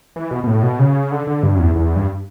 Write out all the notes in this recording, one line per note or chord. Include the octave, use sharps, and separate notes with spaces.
E3
B2
B2
A2
B2
C#3
D3
D3
G2
F#2
E2
E2
G2